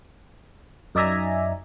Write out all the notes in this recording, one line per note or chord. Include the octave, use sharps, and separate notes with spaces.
F#2 D#4 D5 E5 G#5 A#5